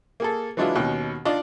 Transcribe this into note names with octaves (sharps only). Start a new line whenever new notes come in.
A#3 G#4 A4
E3 F#3 G#3 D4 E4 F4
D#2 B2 C#4 G5 F#6
D4 D#4 F4 D5 D#5